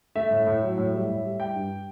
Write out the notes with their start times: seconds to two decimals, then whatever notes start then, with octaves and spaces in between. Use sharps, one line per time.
0.15 A3 E5
0.31 A2
0.47 A2
0.63 F#3
0.78 A2
0.93 G3
1.08 A2
1.24 G3
1.39 G3 G5
1.55 G2